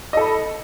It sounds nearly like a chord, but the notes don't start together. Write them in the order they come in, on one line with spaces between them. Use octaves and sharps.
D#5 A4 B5